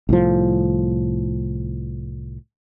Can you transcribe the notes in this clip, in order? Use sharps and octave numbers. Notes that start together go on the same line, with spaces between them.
C2 A2 F3